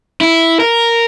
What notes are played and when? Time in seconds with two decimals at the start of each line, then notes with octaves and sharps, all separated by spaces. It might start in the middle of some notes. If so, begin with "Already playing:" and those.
0.21 E4
0.60 A#4